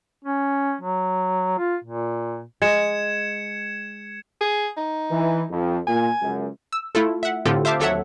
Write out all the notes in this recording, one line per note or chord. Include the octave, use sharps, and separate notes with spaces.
C#4
F#3
F4
A#2
G#3 G#6 C#7 E7
G#4
D#4
E3
F2
A#2 G#5
C#2 F#2
E6
A3 E4 F4 A4
E5 F#5
A2 D3 C4 F4 G4 A4
C5 E5 F5 A5 D6
D#2 F#3 A4 C#5 E5 F#5